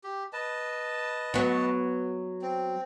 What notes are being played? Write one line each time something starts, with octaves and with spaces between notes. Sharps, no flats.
G4
B4 D#5 A5
F#3 B3
C4